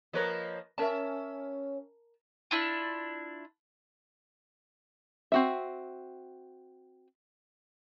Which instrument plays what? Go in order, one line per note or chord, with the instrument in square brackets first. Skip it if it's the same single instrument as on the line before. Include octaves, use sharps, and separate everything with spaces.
[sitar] F3 A#3 C#5 [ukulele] A#4 B4 D#5
[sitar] C#4 E5 [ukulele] A#4 A5
[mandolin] D4 E4 F4
[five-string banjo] C4 F#4 E5